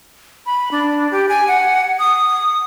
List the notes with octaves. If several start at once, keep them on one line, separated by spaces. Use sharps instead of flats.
B5
D4
G4
G#5
F#5
D#6